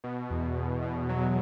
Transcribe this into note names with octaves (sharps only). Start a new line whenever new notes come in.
B2
E2
E2
B2
F#3